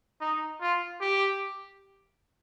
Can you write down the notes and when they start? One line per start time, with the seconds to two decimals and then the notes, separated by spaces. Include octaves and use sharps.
0.21 D#4
0.61 F4
1.01 G4